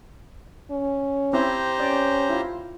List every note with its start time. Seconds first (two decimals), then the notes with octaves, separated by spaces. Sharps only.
0.71 C#4
1.33 C4 E4 G4 C5 A#5
1.80 C#4 D5
2.29 E4 F4